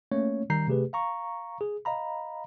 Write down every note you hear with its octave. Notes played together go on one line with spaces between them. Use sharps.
A3 A#3 C#4 C#5
D#3 G3 A#5 G6 C7
C3 A3 G4 G#4 B4
F5 A#5 C#6
G#4
D#5 F5 A#5 B5